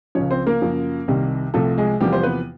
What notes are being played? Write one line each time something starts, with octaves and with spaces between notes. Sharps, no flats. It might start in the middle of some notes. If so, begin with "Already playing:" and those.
C#2 C#3 F3 C#4 C#5
C4 C5
A#3 A#4
F#2 C#3 F3
C2 C3 D#3 G3
C2 C3 F3 A3 A4
G#3 G#4
E2 C3 F3 G3 A#3 G4
C5
B3 B4